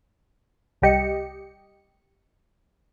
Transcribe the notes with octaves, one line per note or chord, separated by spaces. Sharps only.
C2 G3 G4 D#5 C#7